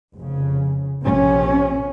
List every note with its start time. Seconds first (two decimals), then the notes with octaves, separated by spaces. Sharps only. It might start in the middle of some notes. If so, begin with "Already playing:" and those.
0.16 F1 C#3
1.04 A#1 C3 F3 C#4